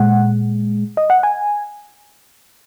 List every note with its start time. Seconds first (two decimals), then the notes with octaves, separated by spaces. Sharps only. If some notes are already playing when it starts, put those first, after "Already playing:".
Already playing: A#2 G#3 F#5
0.97 D#5
1.10 F#5
1.23 G#5